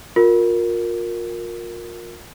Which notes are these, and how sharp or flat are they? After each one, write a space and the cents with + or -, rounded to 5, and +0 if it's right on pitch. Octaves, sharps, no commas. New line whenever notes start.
F4 +35 A#4 +0